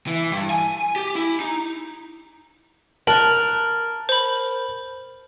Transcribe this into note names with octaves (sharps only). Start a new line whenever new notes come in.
E3
G2
G#5
G4
E4
D#4
A#4 A5 F#6 F#7
C5 B5